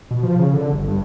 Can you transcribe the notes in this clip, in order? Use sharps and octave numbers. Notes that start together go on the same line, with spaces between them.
B2
F3
C#3
D3
G1
G2